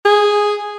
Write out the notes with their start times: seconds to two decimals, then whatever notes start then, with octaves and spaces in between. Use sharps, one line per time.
0.05 G#4